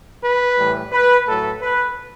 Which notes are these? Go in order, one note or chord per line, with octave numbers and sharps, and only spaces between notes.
B4
A2 E3 G3
B4
A2 F#3 A4
B4